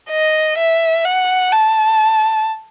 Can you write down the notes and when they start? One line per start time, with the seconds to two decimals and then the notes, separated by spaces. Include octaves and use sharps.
0.11 D#5
0.58 E5
1.05 F#5
1.52 A5